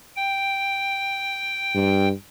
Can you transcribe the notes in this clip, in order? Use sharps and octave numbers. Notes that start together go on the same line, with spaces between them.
G5
G2